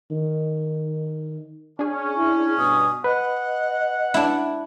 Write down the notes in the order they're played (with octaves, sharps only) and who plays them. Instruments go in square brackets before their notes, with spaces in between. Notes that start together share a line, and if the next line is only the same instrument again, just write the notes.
[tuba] D#3
[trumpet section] C#4 [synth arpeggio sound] D4 G#4
[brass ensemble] E4
[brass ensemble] G2 B2 [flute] D#6
[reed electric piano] B4 [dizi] D#5 [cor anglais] F#5
[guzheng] D4 E4